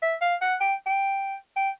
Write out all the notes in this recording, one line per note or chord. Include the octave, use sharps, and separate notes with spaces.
E5
F5
F#5
G5
G5
G5